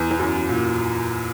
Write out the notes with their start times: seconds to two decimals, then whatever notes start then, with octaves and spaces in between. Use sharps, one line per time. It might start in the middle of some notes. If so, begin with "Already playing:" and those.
Already playing: E2
0.11 E2
0.19 F#2
0.49 A#2